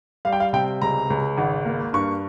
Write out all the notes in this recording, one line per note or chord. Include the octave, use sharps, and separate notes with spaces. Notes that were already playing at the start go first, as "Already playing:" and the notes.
G3 F5
G5
F5
C3 G5
C#2 A#5
C#2
G#1
A#3
G2 C#6